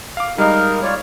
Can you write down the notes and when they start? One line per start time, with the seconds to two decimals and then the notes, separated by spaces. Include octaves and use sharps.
0.17 F5 D6
0.38 G3 G#3 D#4 A#4 F5
0.83 F4 C#5 D5